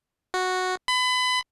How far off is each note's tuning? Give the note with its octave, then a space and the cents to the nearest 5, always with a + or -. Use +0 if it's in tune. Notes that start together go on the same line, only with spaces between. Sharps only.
F#4 -5
B5 +30